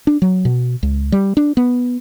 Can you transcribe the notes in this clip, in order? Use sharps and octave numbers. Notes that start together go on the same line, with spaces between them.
D4
F#3
B2
C#2
G3
D4
B3